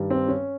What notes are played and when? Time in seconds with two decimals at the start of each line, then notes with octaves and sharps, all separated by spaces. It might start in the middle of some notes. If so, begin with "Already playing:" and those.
Already playing: G2 D#3 G3
0.10 C4
0.28 C#4